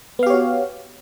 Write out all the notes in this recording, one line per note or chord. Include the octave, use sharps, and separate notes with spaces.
B3 F#4 G4 C#5 F5